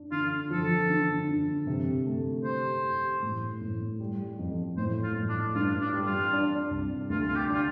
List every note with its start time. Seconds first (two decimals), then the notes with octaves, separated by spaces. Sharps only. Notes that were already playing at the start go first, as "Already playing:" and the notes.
Already playing: D4
0.11 D3 F4
0.50 F3 A4
0.90 D3
1.28 D3
1.67 C3
2.06 A3
2.44 G4 C5
2.83 G4
3.22 A2
3.61 A2
4.00 G3
4.39 F2
4.77 A2 C5
5.03 F4
5.16 A2
5.29 D4
5.54 G2 F4
5.81 D4
5.94 G3
6.06 F4
6.33 D4
6.71 C2
7.10 D2 F4
7.29 F4
7.35 G4
7.49 D4 F4